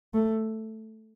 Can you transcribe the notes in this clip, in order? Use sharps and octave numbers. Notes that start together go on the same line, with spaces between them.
A3